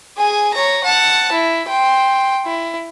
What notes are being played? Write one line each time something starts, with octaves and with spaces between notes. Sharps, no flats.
G#4 G#5
C#5 A#5
F#5 A5
E4
G5 C6
E4